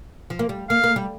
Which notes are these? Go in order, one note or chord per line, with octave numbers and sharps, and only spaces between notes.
F3
A#3
G3
A#3 F5
A#3
G3